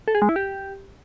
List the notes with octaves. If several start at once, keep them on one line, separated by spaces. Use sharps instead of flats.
A4
G#4
G#3
E4
G4